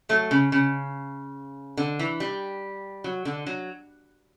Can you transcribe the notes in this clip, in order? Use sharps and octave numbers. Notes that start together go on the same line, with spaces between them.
F#3 A3
C#3
C#3
D3
E3
G3
F#3
D3
F#3